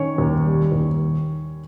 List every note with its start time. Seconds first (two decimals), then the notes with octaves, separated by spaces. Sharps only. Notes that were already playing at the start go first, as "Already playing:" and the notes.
Already playing: D#3 C#4 C#5
0.18 D#2
0.45 G3
0.72 D#2